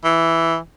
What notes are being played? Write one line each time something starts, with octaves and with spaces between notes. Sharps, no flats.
E3